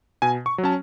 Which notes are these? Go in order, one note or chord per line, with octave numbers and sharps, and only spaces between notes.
B2 G#5
C#6
F#3
C#4 A5